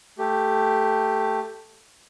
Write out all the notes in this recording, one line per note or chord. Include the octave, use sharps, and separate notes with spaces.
A3 G4